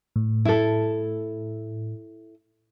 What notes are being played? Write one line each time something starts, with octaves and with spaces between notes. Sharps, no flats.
A2
E4 A4